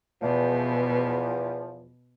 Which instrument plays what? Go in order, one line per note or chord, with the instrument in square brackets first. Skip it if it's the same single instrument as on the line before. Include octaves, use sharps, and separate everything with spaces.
[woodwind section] E2 F3 [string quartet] B2